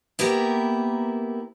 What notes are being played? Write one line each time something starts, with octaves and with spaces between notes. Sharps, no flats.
A#3 B3 E4 G4 A#4